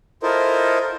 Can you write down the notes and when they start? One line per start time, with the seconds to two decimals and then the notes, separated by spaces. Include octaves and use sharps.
0.23 E4 F4 A4 A#4 C5 D#5